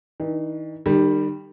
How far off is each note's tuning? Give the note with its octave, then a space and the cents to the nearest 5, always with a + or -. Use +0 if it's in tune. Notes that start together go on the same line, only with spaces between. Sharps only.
D#3 +45 D#4 -40
D#3 -40 G3 +0